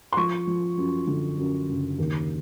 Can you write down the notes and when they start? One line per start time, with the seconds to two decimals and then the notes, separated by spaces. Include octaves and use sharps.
0.12 C6
0.17 F3 C#6
0.47 F3
0.77 F#2
1.07 D3
1.38 F#2
1.69 F#1
1.98 D#2